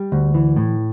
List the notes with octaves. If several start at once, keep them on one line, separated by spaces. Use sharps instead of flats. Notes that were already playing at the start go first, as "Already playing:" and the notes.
Already playing: G3
D2
E3
A2